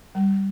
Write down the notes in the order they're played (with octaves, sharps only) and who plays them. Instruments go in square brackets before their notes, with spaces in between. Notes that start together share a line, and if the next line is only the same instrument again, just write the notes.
[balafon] G3